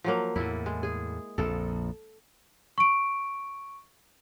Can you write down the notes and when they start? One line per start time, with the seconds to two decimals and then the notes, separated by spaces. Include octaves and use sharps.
0.04 F3 F#3 A#3
0.36 E2 A2 E4
0.66 G#3
0.83 G#4
1.38 A#1 F2 A4
2.78 C#6 D7